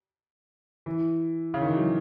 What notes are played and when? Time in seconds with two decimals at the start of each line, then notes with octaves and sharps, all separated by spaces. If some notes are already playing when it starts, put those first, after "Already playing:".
0.86 E3
1.54 C#3
1.61 D#3
1.69 E3
1.76 F#3